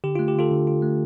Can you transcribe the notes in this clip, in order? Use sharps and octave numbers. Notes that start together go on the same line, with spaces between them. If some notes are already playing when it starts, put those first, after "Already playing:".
D3 G4
A3 F4
G4
D3 F4 A4
D3
F4
A3